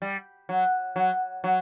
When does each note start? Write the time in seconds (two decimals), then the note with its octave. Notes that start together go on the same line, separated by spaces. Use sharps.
0.02 G3
0.49 F#3
0.96 F#3
1.44 F#3